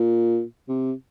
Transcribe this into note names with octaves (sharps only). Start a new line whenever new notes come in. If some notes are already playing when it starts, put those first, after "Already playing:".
Already playing: A#2
C3